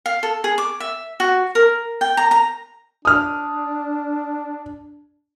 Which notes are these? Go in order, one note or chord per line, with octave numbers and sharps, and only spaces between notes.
F5
A4
G#4
D6
E5
F#4
A#4
G5
A#5
A#5
D4 D#6 F6